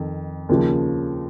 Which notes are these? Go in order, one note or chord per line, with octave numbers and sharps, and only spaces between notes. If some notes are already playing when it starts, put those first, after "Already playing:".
Already playing: F2 D#3
D#2 C#3 F3